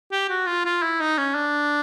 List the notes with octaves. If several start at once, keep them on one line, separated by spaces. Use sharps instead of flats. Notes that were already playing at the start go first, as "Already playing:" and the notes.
G4
F#4
F4
F4
E4
D#4
C#4
D4